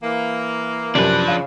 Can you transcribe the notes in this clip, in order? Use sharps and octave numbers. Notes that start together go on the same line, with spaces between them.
E3 A#3
F#2 C3 F3 D4 B4 D5
C#3 F5